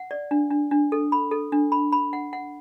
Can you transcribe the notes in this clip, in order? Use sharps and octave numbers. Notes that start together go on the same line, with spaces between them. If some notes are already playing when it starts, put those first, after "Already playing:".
Already playing: F#5
D5
D4
D4
D4
A4
B5
A4
D4
B5
B5
F#5
F#5